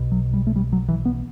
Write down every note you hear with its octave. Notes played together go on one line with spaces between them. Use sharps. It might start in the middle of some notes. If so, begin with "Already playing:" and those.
Already playing: B1 B2
F#3
G3
A3
G3
F#3
E3
B3